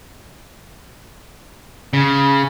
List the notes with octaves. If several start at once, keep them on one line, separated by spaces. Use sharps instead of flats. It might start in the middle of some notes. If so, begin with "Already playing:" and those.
C#3